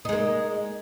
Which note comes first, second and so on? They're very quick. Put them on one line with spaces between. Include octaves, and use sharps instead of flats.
D#4 G#3 A#3